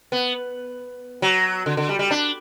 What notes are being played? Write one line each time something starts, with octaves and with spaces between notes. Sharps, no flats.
B3
F#3
D3
D3
G3
G3
D4